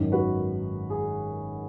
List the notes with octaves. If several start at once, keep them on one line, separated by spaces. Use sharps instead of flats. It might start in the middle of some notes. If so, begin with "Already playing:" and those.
Already playing: G#1 F#2 D#3
F#4 B4
G#4